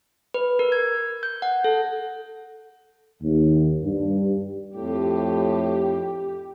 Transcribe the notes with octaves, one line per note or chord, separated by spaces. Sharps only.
B4
A#4
G#6
G6
F#5
A4
D#2
G2
F2 A2 G4